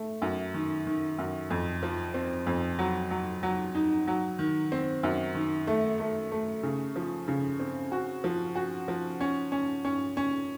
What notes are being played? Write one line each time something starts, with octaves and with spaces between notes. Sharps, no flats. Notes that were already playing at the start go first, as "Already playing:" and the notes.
Already playing: A3
F#2
D#3
D#3
F#2
F2
F3
C4
F2
F#3
F#3
F#3
D#4
F#3
D#3
C4
F#2
D#3
A3
A3
A3
C#3
F3
C#3
C4
F#4
F3
F#4
F3
C#4
C#4
C#4
C#4